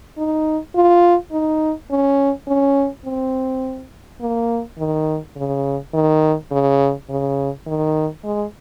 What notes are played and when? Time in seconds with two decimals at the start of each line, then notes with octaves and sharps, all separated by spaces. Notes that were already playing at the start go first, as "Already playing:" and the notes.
0.17 D#4
0.75 F4
1.32 D#4
1.91 C#4
2.48 C#4
3.05 C4
4.21 A#3
4.78 D#3
5.36 C#3
5.94 D#3
6.51 C#3
7.09 C#3
7.66 D#3
8.24 G#3